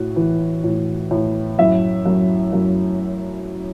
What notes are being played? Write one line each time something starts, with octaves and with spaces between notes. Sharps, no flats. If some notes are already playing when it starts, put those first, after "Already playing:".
Already playing: A2 F#4
E3
A2
A2
F#2 E4 E5
F#2
F#2